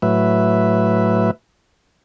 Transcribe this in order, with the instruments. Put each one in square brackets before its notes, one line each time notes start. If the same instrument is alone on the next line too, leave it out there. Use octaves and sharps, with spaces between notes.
[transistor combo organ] A2 F#3 B4 E5